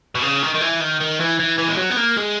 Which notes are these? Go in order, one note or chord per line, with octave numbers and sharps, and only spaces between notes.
B2
C#3
D#3
D#3
E3
D#3
D#3
E3
E3
E3
G#3
F#3
B3
A#3
G#3